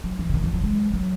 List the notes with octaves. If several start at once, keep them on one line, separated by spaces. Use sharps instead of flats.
F#3
E3
C#3
D#3
E3
F#3
G#3
F#3